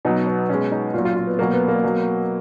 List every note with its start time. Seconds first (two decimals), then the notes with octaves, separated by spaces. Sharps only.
0.05 B2 F#3 D#4
0.27 B3
0.49 B2 G#3 C#4
0.72 D#4
0.94 A#2 F#3 F4
1.05 F4
1.16 F4
1.27 B3
1.39 B2 F#3 A#3
1.54 B3
1.68 A#3
1.83 B2 F#3